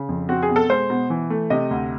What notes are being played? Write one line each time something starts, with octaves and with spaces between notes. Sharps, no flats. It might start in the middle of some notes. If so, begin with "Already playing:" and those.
Already playing: C#3
F2
C4 F#4
G#4
B2
A4
G#3 C5
B2
E3
A3
C3 D#5
D2